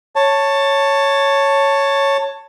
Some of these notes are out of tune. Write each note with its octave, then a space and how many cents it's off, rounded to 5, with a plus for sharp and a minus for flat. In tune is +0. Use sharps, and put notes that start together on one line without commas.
C#5 +0 A5 +15